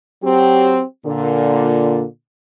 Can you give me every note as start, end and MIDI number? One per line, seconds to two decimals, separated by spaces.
0.23 0.81 54
0.23 0.81 60
0.23 0.81 67
1.06 2.03 46
1.06 2.03 50